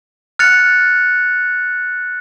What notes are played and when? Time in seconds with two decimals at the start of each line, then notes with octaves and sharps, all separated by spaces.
0.39 F6 F#6 A6 C#7 F7